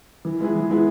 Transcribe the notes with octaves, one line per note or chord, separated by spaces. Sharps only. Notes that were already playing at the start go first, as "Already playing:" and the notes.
E3
G#3 B3 E4 G#4
E3
G#3 B3 E4 G#4